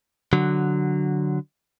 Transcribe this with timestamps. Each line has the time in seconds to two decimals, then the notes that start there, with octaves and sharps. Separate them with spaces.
0.33 D3 F#3